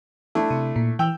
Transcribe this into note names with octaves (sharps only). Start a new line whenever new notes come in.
A3 D4 E4
C3
A#2
E3 G5 E6